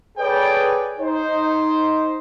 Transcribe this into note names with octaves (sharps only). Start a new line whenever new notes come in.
G#4 A4 B4 C#5 D5 G5
D#4 C5